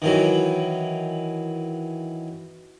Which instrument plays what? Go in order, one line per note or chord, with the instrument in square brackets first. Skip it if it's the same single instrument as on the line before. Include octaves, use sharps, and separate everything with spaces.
[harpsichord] D#3 E3 F#3